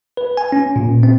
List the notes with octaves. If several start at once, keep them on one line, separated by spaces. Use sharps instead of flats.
B4
G#5
C#4
A#2
C4